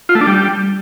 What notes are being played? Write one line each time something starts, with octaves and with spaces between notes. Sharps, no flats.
F4
A3
D4
G3